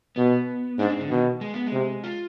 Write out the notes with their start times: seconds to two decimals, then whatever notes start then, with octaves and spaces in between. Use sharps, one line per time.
0.16 B2 B3
0.78 G#2 D4
0.90 C4
1.00 D3
1.10 B2 D#3
1.41 G#3
1.54 B3
1.66 G#3
1.72 C3
2.04 F4